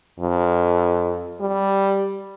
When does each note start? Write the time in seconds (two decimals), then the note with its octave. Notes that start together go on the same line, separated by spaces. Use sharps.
0.20 F2
1.41 G3